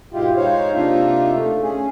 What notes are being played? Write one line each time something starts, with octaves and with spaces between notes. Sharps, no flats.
G#2 B2 G#3 E4 F4 G4
G#3 D#4 C5 C#5 F5
C3 A#3 D4 D#4 F4 E5
A3
C#4 G#4